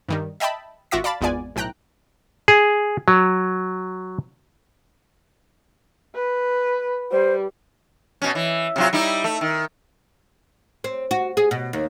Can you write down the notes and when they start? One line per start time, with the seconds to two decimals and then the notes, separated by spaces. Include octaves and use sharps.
0.09 G2 D#3 G3
0.40 D#5 E5 G5 A5 B5
0.91 G#1 F4 F#4 E5 D6 A#6
1.04 D5 F5 A5 B5 A6
1.21 G#1 E2 B3 F4 D5 G#5
1.56 B1 A2 G5 A#5 F#6
2.48 G#4
3.08 F#3
6.15 B4
7.11 G3 C5
8.22 B2 C#4
8.35 E3
8.76 C3 F#3 F4
8.93 G3 D#4 E4
9.24 A3
9.41 D#3
10.84 C4
11.11 F#4
11.37 G#4
11.51 B2
11.73 D#2